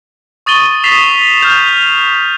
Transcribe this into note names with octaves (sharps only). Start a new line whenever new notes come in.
C#6 D#6 A6 D#7 G7
D#6 A6 B6 C7 E7 F7
F6 G6 F7